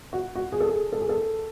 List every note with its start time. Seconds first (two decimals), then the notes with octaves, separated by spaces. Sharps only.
0.13 F#4
0.35 F#4
0.52 G#4
0.60 A4
0.68 G#4
0.92 A4
1.01 G#4
1.09 A4